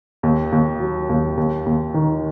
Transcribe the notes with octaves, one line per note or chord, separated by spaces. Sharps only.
D#2
D#2
F#3
D#2
D#2
D#2
D#3